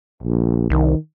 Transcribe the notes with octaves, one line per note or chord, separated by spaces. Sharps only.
A#1
C2 D#3